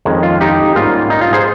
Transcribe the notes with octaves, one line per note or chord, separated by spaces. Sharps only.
F2 D#3 G#3 C#4
F4
D#4 G4
G#2 G3 A#3 C#4 F4
D#4
F4
G#4 C5